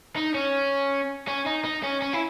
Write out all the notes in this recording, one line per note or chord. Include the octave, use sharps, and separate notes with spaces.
D#4
C#4
C#4
D#4
D#4
C#4
C#4
E4